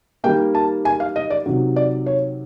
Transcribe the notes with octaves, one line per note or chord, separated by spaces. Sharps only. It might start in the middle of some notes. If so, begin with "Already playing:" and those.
D#3 G3 A#3 G5
A5
G#5
F5
D#5
D5
C3 D#3 F#3
D5
C#5